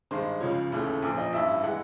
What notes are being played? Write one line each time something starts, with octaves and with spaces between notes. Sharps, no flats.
G2 D#3 G#3 C5
C#2 C#3 F3 C#5
D#2 C#3 E3 A3
A#1 A#2 F3
D#5
A1 G2 E3 E5
E3 G#3 F#5